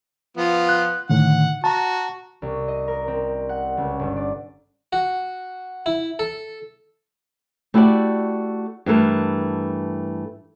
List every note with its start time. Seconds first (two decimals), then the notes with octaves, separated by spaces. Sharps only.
0.37 F3 B3 F4
0.69 F#6
1.10 A2 D3 D#3 F#5
1.64 F#4 A5 A#5
2.42 C2
2.68 D#5
2.88 A#4
3.08 C4
3.49 F#5
3.77 C#2
3.99 G1
4.16 D5
4.93 F#4
5.86 E4
6.19 A4
7.74 A3 E4 F#4 G4 C#5 D5
8.86 G2 E3 A3 A#4